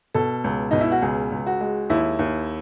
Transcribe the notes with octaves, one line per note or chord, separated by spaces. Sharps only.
B2 A4
C#2
B2 D#4
E4
F#4
C#2 G#4
C#2
F#4
G#3
D#2 E4
D#2